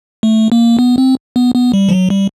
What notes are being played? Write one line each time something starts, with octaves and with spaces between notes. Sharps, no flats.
A3
A#3
B3
C4
B3
B3
G3
F3
F#3
G3